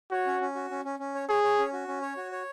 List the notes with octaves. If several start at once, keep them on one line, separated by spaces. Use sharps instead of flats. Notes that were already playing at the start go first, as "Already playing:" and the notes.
F#4 C#5
C#4
C#4
F#4
C#4
C#4
C#4
C#5
G#4 C#5
C#5
C#4
F#4
C#4
C#5
F#4
C#5